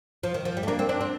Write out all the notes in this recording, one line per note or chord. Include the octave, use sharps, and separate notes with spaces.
F3
D#3
F3
G3
A3
A#3 D4
C4
C4 D4
C4